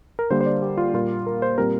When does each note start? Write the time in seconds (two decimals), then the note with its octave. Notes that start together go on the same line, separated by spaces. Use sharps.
0.19 A#4
0.30 D3 G3 A#3 C5
0.41 C5
0.46 D5
0.62 G4
0.78 F4
0.94 A#2 G3 A#3 F4
1.26 A#4
1.42 C5
1.58 A#2 G3 C4 A#4